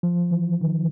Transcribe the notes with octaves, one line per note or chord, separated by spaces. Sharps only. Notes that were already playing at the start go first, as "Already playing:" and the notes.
F3
E3
D#3